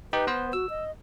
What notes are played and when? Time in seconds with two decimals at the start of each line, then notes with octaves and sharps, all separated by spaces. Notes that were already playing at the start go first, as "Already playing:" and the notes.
0.13 D#4 G4 B4
0.27 B3 C5
0.53 F#4 E6
0.70 D#5